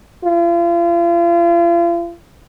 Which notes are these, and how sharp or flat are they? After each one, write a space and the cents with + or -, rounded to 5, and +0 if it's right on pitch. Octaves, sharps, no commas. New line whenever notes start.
F4 -40